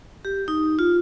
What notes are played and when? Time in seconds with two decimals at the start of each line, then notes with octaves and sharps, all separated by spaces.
0.25 G4
0.48 D#4
0.79 F4